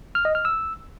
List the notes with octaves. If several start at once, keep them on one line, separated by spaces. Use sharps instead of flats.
F6
D#5
F6
E6